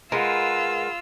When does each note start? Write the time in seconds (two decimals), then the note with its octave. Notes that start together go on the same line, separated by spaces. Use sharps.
0.12 G#3 F4 A#4 B4 F#5 E6